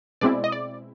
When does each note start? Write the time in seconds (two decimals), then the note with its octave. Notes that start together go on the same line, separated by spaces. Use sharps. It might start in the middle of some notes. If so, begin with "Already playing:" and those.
0.21 B2 G#3 C4 E4 D5
0.44 D#5
0.52 D5